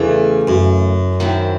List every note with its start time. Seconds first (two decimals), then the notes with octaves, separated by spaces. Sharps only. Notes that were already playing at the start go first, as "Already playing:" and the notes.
Already playing: E2 C#3 E3 A3
0.48 F#2
1.20 D#3 F#3 C4 E4